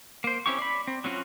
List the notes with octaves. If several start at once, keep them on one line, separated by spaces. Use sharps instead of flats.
A#3 C5
C4 C#4 E4 G4 C#6
D5 B5
C4
F#3 C4 C#4 F4 F#4